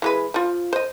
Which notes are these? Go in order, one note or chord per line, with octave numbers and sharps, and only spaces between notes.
E3 G#3 B4
F3 F4
C5 D#5